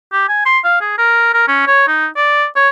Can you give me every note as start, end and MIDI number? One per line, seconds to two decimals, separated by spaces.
0.13 0.27 67
0.29 0.45 80
0.46 0.59 84
0.64 0.80 77
0.81 0.96 68
0.98 1.29 70
1.34 1.45 70
1.48 1.65 61
1.67 1.87 73
1.88 2.06 63
2.16 2.46 74
2.56 2.69 73